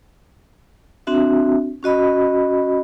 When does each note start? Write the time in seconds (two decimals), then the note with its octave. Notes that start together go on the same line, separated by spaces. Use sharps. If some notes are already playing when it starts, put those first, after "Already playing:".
1.07 C4 D4 F#4 E5
1.83 C#4 F#4 D#5 B5